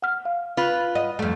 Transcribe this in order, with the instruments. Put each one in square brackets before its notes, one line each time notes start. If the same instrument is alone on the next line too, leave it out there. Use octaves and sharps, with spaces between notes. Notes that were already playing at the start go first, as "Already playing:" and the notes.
[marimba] F#5 F6
F5
[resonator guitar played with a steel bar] F4 B4
[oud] D#5 [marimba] F#5
[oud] F2 A3